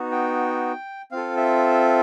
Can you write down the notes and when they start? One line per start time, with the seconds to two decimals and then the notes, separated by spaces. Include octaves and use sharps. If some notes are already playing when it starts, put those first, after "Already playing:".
Already playing: B3 D#4 F#4
0.11 G5
1.12 C4 F4 A4 F5
1.37 E5